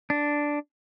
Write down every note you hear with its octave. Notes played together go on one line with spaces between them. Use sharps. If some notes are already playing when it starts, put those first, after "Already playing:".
D4